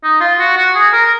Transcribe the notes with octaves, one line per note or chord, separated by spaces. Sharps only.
D#4
F4
F#4
F#4
G#4
A#4